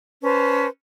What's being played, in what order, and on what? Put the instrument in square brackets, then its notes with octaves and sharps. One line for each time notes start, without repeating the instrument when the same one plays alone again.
[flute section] C#4 B4 C5 A5